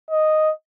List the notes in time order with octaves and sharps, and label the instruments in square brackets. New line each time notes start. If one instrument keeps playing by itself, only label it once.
[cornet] D#5